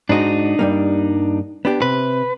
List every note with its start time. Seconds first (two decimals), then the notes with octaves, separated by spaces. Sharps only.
0.09 G#2 D4 D#4 F#4
0.59 G2 G3 A#3
1.65 B3 D4 G4
1.82 C3 B4